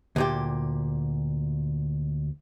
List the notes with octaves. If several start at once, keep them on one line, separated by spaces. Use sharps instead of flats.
D2 A#2 G4